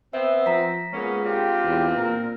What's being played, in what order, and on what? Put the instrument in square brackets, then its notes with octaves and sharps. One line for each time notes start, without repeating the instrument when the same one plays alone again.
[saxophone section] B3 C4 [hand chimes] E5
[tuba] F3 [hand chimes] A#5 B6
[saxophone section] A#2 A#3 C#4 [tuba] G#3 [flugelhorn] B3
[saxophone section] C4 D4 F4 [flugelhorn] G4
[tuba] E2
[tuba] A#2 [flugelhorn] A#4